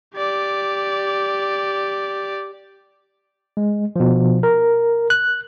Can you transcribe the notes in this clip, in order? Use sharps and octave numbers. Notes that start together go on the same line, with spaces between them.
G4 D5
G#3
B2 F3
A#4
F#6